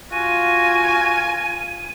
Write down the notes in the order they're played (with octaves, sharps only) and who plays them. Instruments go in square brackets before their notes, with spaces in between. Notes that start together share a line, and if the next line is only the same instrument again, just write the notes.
[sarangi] F4 [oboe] F#4 [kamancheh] G#5 [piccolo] D#7